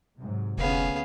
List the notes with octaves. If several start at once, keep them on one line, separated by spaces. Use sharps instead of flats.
G#2 C3 F#3
F1 D2 B3 C#4 G#4 F5